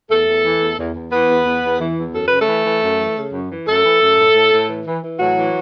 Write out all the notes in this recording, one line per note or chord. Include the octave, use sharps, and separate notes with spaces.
E2 A3 A4
E2
E3
E2
E2
E2
E3 B3 B4
E2
E2
E2
E3
E2
F#2 A4
C#3 B4
A3 A4
E3
E3
F#2
E3
C#3
F#2
E3
F#2 A3 A4
E3
F#2
A2
A2
A2
E3
E3
E3
A2 F#3 F#4
E3